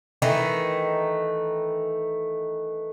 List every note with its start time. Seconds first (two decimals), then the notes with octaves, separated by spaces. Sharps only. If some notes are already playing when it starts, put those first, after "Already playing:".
0.22 D#3 E3 A3